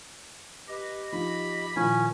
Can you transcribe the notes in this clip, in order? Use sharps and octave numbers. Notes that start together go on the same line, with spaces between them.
G4 B4 D#5
F3 D#4 B5
A#2 D#3 F3 C#4 E4 G#5